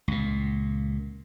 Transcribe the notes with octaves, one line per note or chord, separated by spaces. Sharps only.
C#2 A#2